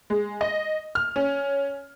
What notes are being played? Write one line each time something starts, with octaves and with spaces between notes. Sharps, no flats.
G#3
D#5
F6
C#4